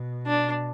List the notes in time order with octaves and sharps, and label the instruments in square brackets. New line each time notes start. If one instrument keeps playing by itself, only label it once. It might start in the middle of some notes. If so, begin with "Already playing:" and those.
Already playing: [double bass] B2
[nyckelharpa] D4